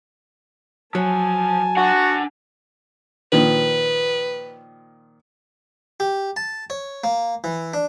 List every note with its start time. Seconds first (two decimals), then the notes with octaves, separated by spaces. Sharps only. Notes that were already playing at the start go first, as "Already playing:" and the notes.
0.95 F3 F#3 G#5 A5
1.77 D4 F#4 F#5
3.32 A#2 D#3 F3 B4
6.00 G4
6.37 A5
6.70 C#5
7.04 A#3
7.44 E3
7.74 D4